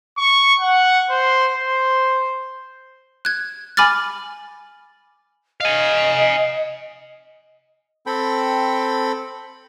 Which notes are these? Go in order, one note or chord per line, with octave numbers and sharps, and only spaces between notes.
C#6
F#5
C5
C5
F#6 G#6
G#5 B5 D6 F6 A6
D#5 F5 G#5
C4 A4 G5 B5